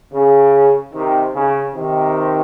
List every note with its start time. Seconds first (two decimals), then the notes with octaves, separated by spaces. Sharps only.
0.13 C#3
0.94 C3 D#3
1.35 C#3
1.75 C3 D#3